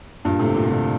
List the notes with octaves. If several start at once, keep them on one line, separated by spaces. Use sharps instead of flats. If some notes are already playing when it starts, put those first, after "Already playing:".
G2 A#2
A2 C3
A#2 D3
C3
A#2 D3